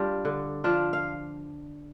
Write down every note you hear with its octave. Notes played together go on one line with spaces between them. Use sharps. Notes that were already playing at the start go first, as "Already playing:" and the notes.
Already playing: G3 D4 F4 G4
D3
F3 D4 F4
F5